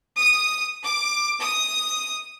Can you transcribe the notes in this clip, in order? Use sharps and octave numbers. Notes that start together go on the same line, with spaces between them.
D#6
D6
D#6